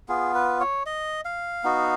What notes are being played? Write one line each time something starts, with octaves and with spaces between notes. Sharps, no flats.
B3 F4 G#4
B4
C#5
D#5
F5
B3 D#4 F#4